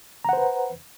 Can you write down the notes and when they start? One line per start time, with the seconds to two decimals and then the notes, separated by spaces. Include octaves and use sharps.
0.25 A#5
0.29 F#5
0.33 C5
0.37 B4